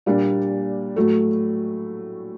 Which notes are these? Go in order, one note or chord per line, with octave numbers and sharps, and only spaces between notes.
A#2 G3 A#3 D4
A2 F#3 A3